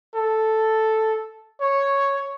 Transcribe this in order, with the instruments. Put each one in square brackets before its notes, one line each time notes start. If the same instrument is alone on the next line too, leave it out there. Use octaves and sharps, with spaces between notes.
[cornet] A4
C#5